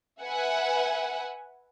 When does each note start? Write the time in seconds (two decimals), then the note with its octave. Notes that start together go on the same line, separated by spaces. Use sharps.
0.23 B4 E5 F#5 G#5